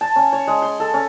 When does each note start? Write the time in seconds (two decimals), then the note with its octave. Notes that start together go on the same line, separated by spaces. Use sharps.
0.01 A5
0.16 C#4
0.33 C#5
0.47 G#3
0.62 C6
0.80 A4
0.94 C#4